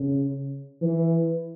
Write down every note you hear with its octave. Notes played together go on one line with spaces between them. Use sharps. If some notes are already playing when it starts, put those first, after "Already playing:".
Already playing: C#3
E3